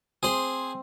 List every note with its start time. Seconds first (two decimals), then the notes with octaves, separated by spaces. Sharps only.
0.23 C4 G#4 C5